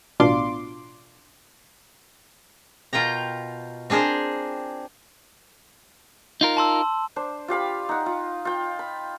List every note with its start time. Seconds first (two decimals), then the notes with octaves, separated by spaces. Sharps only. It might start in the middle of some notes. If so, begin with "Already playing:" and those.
0.20 A1 B2 D4 F4 C6 D6
2.93 B2 F4 A#4 G5 A#5
3.90 C4 D4 G#4 A#4 C5
6.41 D#4 F4 A#4
6.57 A5 C6 E6
7.16 D4 C5
7.48 F4 G4 F5 B5
7.89 D#4 F#5
8.06 F4
8.45 F4 G5
8.79 B5